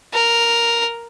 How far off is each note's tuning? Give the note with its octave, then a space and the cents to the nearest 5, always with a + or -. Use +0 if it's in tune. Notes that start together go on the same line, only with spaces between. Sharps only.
A#4 +0